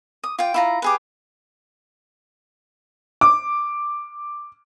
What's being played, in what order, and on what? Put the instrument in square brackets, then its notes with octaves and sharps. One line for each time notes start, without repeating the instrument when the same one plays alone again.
[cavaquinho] D#6
F4 G5
E4 F4 A#5
G4 G#4 B4
[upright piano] D6